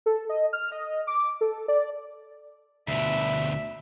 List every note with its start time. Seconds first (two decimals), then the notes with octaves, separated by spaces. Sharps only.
0.06 A4
0.29 D#5
0.53 F6
0.72 D#5
1.07 D6
1.41 A4
1.68 D5
2.88 D2 B2 E5